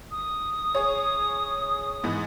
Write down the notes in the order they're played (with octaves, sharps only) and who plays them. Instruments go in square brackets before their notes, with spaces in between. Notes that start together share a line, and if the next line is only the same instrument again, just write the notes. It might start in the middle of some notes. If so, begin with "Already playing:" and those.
[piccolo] D#6
[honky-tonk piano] G#4 C#5
G#2 E3